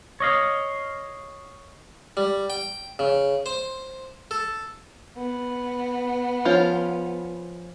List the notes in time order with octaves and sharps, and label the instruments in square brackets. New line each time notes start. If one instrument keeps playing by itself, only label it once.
[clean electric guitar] C#5 D#5 F5
[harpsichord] G3
G5
C#3
C5
A4
[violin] B3
[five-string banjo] F3 C#4 F4